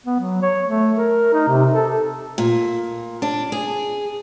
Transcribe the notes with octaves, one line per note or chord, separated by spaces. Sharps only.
B3
F#3
C#5
A3
A#4
D#4
C3
A4
A#2
D4
G#4